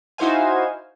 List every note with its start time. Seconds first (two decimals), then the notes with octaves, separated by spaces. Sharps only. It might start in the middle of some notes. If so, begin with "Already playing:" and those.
0.18 D#4 E4 F#4 C5 F5 G#5